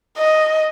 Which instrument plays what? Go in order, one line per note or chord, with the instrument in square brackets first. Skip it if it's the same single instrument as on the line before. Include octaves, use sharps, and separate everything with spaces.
[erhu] D#5